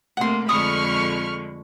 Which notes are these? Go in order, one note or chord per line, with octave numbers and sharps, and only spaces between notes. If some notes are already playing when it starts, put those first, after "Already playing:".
C3 A3 A#3 F#5 C6
F2 D3 G#3 B5 C#6 D#6 F6